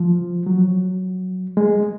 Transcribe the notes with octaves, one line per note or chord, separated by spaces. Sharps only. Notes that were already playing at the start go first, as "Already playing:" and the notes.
Already playing: F3
F#3
G#3